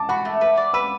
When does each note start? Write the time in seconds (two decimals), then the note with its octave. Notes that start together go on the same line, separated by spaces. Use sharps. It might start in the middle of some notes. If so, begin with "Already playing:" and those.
Already playing: A5 D6
0.09 F#4 F#5 B5
0.25 A3
0.41 B4
0.57 D5
0.74 B4 B5 E6